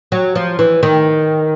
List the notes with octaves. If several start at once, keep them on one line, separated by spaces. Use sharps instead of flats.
F#3
F3
E3
D#3